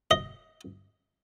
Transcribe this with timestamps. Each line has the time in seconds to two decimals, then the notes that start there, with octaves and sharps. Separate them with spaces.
0.11 D#5